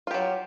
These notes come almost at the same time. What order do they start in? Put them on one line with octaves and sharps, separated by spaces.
F4 G4 F#3